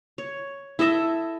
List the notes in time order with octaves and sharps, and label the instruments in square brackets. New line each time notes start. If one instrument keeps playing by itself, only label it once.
[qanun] C#5
E4 A4 D#5 E5